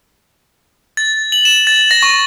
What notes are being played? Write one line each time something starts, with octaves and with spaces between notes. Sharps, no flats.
A6
F#7
E7
A6
A#6
C#6